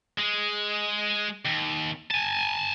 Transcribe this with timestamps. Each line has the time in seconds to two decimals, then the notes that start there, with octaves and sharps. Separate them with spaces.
0.18 G#3
1.45 D#2
2.11 G#5 A5